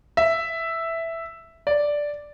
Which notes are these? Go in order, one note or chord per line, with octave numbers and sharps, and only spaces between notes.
E5
D5